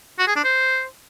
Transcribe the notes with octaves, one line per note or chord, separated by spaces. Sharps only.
F#4
G#4
D4
C5